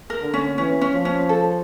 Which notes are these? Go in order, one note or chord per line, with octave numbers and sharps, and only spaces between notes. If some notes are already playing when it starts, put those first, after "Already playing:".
A#4
D3
C#4
E3 C#4
C#4
F3
C#4
A4